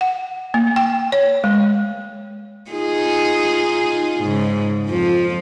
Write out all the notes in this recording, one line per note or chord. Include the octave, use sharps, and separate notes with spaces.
F#5
A#3
G5
C#5
G#3
D#4 F4 G#4
G#2 C#3
F2 F3